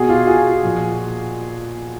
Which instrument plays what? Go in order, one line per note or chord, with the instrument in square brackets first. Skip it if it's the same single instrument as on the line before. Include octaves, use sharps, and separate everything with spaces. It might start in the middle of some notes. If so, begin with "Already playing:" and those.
Already playing: [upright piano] B2 F#4 G#4
F4 G4
F#4 G#4
A#2 F3